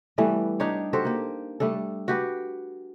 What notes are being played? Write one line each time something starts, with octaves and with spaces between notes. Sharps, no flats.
E3 G3 A3 B3
D4 D#4 G4 C#5
F#4 G4 A4 C5
A#3 G4
G3 A3 D4 A4
F#4 G4 B4